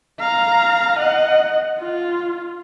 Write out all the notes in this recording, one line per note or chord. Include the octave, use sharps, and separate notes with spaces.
F5 A#5
D#5 F#5
F4